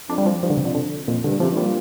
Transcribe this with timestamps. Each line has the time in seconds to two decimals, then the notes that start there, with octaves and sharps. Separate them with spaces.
0.09 F2 D4
0.18 G3
0.26 F3
0.42 G2 F3
0.50 D3
0.57 C3
0.65 F2 D3
0.75 D3
1.08 F2 A#2
1.24 G2 D3
1.40 C3 F3
1.51 G2
1.57 A#2 G3